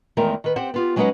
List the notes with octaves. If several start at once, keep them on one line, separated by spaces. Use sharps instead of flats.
E2 D#3 G#3 A3 A#4
D#3 B4
C4 G4 C5 F#5
B3 F4 G4
F#3 G#3 C#4 D#4 B4 F#5